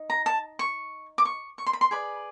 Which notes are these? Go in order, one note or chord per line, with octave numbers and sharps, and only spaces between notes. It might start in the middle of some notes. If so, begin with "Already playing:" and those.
Already playing: D#4
A#5
A5
C#6
D6
C#6
C#6
C6
B5
C6
G#4 B4 D5 B5